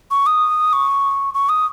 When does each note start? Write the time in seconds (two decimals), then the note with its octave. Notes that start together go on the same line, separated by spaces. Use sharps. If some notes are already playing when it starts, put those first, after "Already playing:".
0.11 C#6
0.26 D#6
0.73 C#6
1.34 C#6
1.49 D#6